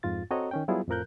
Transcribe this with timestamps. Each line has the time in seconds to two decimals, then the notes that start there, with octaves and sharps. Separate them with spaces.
0.03 F2 G#2 F4 A6
0.31 C4 F#4 A4 C#5 D#5 A#5
0.51 D#3 C#4 G5
0.68 F#3 G3 B3 E4 F4 G#4
0.88 F2 A2 F3 A#4 F#6 G6